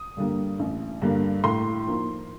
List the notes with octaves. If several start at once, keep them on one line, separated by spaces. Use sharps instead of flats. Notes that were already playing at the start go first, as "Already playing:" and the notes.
Already playing: D#6
G2 D3 G3 A#3
A1
G2 D3 G3 A#3
A2 C6
F3 A#3 D#4